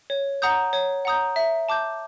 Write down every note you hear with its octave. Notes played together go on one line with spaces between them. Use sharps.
C#5
F#5 A#5 D#6 G6
C#5
F#5 A#5 D#6 G6
E5
A5 D6 G6